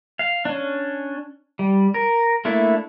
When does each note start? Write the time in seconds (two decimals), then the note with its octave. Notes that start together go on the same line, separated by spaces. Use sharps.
0.19 F5
0.45 C#4 D4
1.59 G3
1.94 A#4
2.45 A3 A#3 D4 E4 A4